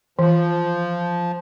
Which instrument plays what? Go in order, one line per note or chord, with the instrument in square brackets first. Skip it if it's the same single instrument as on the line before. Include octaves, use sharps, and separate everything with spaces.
[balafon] E3 [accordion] F3